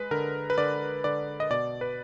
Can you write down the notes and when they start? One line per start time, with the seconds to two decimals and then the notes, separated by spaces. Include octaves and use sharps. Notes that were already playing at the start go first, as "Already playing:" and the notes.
Already playing: G#3 B4
0.11 D3 A#4
0.50 B4
0.58 D3 D5
1.04 D3 D5
1.40 D#5
1.50 B2 D5
1.81 B4